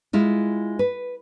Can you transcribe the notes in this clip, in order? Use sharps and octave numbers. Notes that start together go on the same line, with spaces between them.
G#3 E4 F4
B4